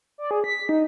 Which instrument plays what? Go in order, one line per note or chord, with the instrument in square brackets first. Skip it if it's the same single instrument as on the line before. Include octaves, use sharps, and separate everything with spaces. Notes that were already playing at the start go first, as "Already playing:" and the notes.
[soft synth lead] D5
G#4
B6
D#4